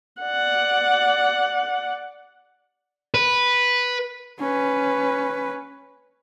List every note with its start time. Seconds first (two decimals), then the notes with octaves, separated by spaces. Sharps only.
0.22 D5 F#5
3.14 B4
4.39 C#4 B4